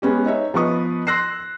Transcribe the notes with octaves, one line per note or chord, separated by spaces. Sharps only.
G#3 B3 C#4 G4
D#4 C#5 E5
F3 B3 B4 D#5 C#6 D#6
C6 E6 F#6 A#6 C7